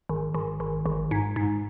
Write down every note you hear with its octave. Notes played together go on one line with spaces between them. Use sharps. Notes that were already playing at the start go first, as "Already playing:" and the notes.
G#1
G#1
G#1
G#1
G#2
G#2